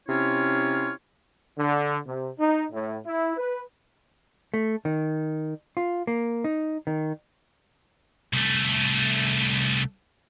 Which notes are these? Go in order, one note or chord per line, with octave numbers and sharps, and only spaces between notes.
C3 C#4 E4 F4 C#5 F6
D3
C3
D#4
A2
E4
B4
A3
D#3
F4
A#3
D#4
D#3
C2 A3